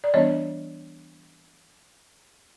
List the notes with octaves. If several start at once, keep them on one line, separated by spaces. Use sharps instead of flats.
D5
E3 G3 B3 D4 C#5 D#5